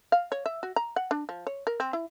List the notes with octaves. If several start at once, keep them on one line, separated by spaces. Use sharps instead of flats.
F5
C#5
E5
F#4
A#5
F#5
D4
F3
C#5
A#4
C4
E4